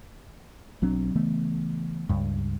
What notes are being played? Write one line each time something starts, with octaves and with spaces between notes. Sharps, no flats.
B1 F#3 C4 D4
C#3 E3 A3 B3
C#2 G2